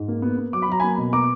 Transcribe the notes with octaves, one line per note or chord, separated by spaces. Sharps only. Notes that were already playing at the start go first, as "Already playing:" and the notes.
Already playing: G#2
A#3
B3
B3
F#3 D6
B5
F#3 A#5
A#3 G#5 B5
B2
B3 A#5 D6